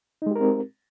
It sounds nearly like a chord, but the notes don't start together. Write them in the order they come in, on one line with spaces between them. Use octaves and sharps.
D#4 G#3 G4 A#4 C4